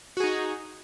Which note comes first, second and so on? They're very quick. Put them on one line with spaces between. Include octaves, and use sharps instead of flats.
F#4 G#4 D#4